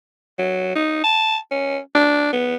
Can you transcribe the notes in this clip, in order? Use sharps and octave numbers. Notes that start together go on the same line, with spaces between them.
F#3
D#4
A5
C#4
D4
B3